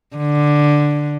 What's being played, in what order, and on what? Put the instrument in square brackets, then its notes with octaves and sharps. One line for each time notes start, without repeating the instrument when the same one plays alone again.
[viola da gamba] D3